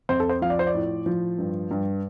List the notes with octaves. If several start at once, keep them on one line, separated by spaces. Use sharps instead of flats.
F2 C5
A4
C5
F3 F5
D5
C5
D5
A2
F3
G2
G2